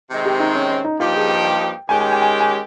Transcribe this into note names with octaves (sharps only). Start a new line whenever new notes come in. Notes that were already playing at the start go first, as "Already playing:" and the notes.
C3 D#3 G#3 C4
G4
D#4
C#4
C#4
D#4
G2 F3 A#3 D#4 F4 G4
G#4
G5
G5
D#3 G#3 C#4 G4 G#5
G#5
G#5
G#5
G#5